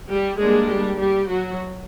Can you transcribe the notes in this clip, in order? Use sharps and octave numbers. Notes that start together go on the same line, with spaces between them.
G3 G4
G3 G#3 A#3 D4 G#4
G3 G4
G3 G4
F#3 F#4